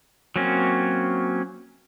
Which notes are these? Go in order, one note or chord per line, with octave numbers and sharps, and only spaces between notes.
F#3 A#3 C4 C#4